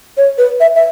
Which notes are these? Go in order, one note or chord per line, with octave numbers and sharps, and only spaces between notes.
C#5
B4
E5
E5